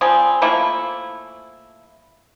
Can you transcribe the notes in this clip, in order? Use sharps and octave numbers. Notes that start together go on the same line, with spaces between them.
F3 G3 C4 G#4
F3 A3 A#3 E4